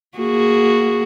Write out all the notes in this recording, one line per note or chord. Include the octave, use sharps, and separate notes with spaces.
A#3 F#4 G#4